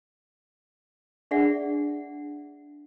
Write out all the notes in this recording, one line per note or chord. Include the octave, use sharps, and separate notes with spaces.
D4 G#4 D5 E5 F#5